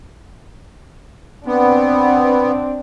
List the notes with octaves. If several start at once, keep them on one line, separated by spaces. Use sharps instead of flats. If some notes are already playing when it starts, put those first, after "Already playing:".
B3 C4 D4